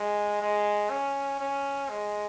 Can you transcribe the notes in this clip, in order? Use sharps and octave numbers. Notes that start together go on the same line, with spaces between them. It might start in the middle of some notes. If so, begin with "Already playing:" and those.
Already playing: G#3
G#3
C#4
C#4
G#3